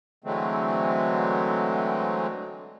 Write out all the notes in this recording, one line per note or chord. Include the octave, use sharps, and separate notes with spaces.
D3 E3 F#3 G#3 A3 C4